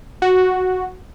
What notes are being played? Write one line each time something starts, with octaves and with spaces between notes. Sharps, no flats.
F#4